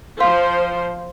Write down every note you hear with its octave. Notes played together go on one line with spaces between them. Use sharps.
F3 C5 F5 C6